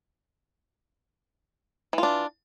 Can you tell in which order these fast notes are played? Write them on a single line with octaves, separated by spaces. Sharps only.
E3 F4 D4